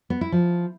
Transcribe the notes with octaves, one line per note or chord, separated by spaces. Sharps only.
B3
E4
F3